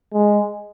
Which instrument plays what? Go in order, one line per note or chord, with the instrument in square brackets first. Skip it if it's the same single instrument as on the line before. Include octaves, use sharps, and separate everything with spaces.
[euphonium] G#3